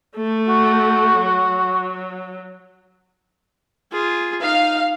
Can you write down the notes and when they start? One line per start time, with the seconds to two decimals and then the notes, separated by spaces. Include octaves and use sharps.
0.16 A3
0.48 F#4
1.18 F#3
3.92 F4 G#4
4.42 D#4 F5